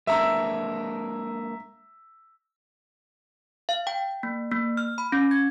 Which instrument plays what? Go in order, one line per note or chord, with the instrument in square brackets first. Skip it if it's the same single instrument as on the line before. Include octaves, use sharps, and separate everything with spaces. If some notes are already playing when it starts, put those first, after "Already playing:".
[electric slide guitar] G#3 A#3 D4 [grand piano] E5 A#5 E6
[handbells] F5
G5
A#3
A#3
F6
B5
C#4
G#6